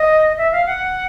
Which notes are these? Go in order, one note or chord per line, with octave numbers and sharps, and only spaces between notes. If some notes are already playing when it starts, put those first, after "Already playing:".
Already playing: D#5
E5
F5
F#5